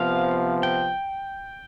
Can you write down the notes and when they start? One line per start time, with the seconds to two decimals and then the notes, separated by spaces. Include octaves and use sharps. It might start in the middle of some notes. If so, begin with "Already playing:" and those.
Already playing: C3 F3 B3 F5
0.63 G5